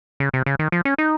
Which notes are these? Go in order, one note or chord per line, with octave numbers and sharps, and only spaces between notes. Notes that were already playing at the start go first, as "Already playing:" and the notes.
C#3
C3
C#3
D#3
F3
C#4
D#4